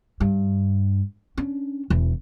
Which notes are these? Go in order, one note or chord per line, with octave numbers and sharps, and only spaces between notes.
G2
C#4 D4
E1 E3